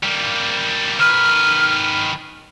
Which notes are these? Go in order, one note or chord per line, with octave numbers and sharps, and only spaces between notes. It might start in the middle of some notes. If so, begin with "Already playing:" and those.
G3 A#3
D#3 B4 F6